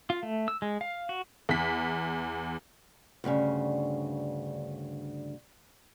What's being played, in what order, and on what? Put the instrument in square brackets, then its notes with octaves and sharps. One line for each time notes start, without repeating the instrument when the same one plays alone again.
[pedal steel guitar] F4
A3
E6
G#3
F5
F#4
[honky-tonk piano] E2 B6
[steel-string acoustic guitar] D2 G2 A#2 C#3